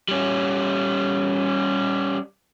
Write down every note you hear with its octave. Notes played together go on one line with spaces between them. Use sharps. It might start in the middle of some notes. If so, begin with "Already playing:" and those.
G3 C#4